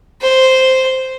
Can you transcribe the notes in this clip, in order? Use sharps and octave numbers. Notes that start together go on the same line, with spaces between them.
C5